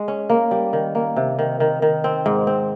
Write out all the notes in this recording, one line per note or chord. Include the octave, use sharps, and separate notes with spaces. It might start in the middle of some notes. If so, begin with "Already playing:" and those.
Already playing: G#3
C#4
A#3
G3
D#3
A#3
C3
D#3
D#3
D#3
C4
G#2
C4